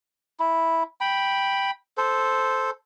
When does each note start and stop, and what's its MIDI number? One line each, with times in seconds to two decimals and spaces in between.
0.40 0.83 64
1.01 1.71 79
1.01 1.71 83
1.98 2.70 69
1.98 2.70 72